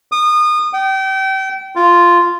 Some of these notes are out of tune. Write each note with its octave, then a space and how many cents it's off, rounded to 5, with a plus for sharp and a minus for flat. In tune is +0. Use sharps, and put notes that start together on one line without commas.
D#6 -30
G5 -30
F4 -5